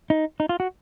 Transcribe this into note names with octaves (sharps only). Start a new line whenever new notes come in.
D#4
D#4
F4
F#4